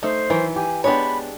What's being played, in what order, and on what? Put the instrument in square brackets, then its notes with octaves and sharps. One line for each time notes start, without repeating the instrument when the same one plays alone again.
[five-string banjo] A3 [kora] D#4 [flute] C5
[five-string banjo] D#3 F#3 [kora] E3
[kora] G4 [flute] G#5
[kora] G#3 D4 G4 [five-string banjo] B3 C#5 [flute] B5